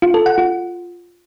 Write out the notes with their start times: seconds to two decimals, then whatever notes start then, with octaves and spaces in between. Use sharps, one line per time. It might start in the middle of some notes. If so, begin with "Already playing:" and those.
0.02 F4
0.14 A4
0.26 F#5
0.38 F4